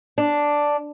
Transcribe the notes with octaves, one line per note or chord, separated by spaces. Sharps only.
D4